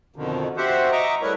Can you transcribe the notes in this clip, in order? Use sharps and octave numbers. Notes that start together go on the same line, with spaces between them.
F2 B2 D3 D#3
F#4 G4 C5 E5 F#5
D#5 E5 A#5 C#6 D6
G3 A3 E4 A#4 B4 C#5